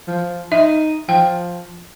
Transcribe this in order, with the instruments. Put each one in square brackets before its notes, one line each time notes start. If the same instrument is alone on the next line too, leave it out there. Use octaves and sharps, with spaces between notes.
[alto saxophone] F3
[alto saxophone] D#4 [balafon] E5
[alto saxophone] F3 [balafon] G5